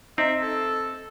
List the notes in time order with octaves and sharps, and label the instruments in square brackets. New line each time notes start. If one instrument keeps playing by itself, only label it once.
[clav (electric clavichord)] C4 [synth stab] D#4 [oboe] E5
[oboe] A4